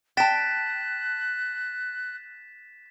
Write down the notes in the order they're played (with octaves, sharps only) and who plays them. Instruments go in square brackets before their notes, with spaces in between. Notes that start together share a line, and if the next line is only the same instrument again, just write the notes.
[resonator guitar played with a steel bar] G5 A5 [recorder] F#6 [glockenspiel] A6 B6 E7